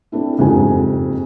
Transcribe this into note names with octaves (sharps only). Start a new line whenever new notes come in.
A3 C4 D4 E4
F#1 F2 G#2 G4 G#5